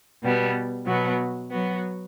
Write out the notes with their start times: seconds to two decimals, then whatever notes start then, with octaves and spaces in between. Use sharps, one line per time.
0.23 B2 G3 B3
0.86 B2 F#3 B3 F#4
1.50 F#3 B3 F#4